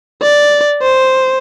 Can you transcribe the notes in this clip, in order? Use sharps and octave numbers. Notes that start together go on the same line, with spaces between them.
D5
C5